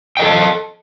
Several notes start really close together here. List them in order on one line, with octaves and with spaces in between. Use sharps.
G5 D#5 A4 A5